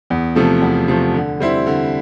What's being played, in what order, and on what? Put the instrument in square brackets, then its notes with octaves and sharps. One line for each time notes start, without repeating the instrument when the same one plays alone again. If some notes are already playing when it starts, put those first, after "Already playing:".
[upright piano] E2
C3 F3 A3
E2
C3 F3 A3
D3
G3 C4 E4
D3